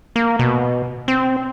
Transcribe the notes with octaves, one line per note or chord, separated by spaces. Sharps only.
A#3
B2
C4